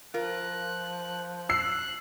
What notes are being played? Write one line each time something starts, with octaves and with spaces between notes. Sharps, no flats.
F3 F4 A#4 F#6
E6 F#6 C7